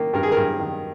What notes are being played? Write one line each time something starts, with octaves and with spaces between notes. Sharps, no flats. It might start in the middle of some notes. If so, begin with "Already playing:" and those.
Already playing: D#3 A#3
G2 A#4
G#4
G2 A#4
D#3